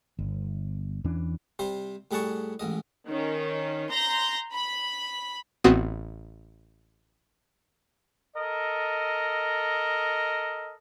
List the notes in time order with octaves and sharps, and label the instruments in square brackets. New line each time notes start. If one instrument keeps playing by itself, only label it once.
[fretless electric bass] G1
E2 E3 C#4 D4
[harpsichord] C3 G3 C5
A2 G3 G#4 F#5 A5 C#6
A1 G#2 D#5
[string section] D#3 C#4
A#5 C6 G6 A#6
B5
[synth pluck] A1 B3 C4 F#4 D#6
[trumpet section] A4 A#4 D#5